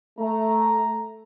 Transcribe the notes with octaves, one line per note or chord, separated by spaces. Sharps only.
A3 A#5